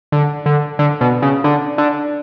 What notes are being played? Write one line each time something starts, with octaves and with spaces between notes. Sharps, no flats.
D3
D3
D3
B2
C#3
D3
D3